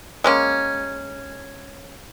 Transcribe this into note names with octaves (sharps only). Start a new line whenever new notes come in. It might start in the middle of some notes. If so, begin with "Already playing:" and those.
G#3 A#3 C#4